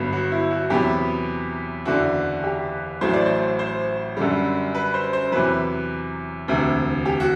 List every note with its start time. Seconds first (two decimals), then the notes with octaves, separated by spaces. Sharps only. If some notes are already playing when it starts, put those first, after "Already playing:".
Already playing: G1 G2 F#3 B3
0.13 F#4
0.32 E4
0.50 F#4
0.70 E2 C3 F#3 B3 G4
1.85 F#1 E2 D3 F#4
2.44 G4
3.01 A1 A2 F#3 A3 C5
3.13 D5
3.26 C5
3.59 C5
4.17 F#2 D3 G3
4.75 B4
4.94 C5
5.13 C5
5.32 E2 C3 F#3 B4
6.48 E1 D2 C3
7.05 G4
7.20 F#4